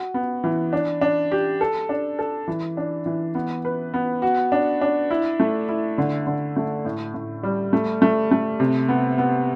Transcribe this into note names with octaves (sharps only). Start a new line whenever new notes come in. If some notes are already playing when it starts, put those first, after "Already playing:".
Already playing: F#4
B3
E3
D4
D4
G4
A4
D4
A4
E3
D4
E3
B3
B4
B3
F#4
D4
D4
E4
A3
E4
D3
D3
A3
A2
A2
G3
A3
A3
A3
C3
B3
B3